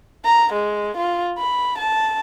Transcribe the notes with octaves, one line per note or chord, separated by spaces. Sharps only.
A#5
G#3
F4
B5
A5